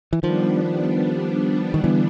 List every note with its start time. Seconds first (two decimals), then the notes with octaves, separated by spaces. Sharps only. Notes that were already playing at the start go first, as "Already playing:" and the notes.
0.13 E3
0.23 D#3 F3 G3 B3 D4
1.74 D#3
1.84 D3 E3